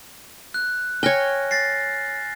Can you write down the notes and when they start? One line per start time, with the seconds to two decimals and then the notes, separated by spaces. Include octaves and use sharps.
0.54 F#6
1.03 C#5 G5 G#5 F6 A#6
1.51 A6 A#6 C7